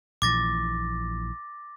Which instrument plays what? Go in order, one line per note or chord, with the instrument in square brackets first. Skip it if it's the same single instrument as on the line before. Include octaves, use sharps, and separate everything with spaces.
[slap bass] A#1 A#2 E3 [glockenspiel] D6 A6 A#6